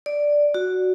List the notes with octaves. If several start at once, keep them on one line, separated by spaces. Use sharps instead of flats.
D5
F#4